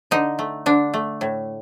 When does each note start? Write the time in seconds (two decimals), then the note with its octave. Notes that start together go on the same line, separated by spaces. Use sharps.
0.11 D3 D#4
0.39 A3
0.66 D3 D4
0.94 A3
1.21 A2